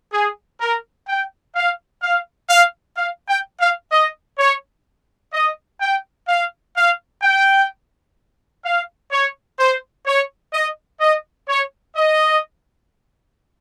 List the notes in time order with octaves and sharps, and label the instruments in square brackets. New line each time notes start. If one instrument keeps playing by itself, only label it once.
[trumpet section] G#4
A#4
G5
F5
F5
F5
F5
G5
F5
D#5
C#5
D#5
G5
F5
F5
G5
F5
C#5
C5
C#5
D#5
D#5
C#5
D#5